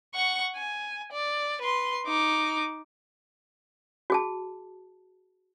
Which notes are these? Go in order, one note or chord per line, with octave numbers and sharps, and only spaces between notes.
F#5 C#6
G#5
D5
B4 C6
D#4 D6
F#4 G#4 A5